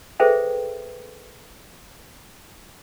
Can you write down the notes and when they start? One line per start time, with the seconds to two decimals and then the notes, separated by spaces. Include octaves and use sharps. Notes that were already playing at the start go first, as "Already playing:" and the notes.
0.20 G#4 A4 B4 C5 E5 G5